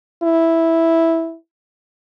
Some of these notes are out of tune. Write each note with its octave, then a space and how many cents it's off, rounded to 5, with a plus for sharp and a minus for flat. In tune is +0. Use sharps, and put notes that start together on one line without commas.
E4 -5